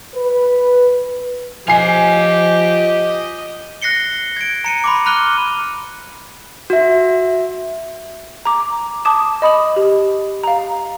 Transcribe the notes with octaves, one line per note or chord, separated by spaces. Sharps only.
B4
F3 G4 D#5 F5 G#5 C7
F#6 A#6 C7 C#7 G7
G#6 D7
A#5 C#7 D#7
B5 C6 D6
B5 F6 F#6 D#7 G7
F#4 E5
A#5 D6
A5 D6 D#6 E7
D#5 B5 D#6 F#7
G4
F5 A#5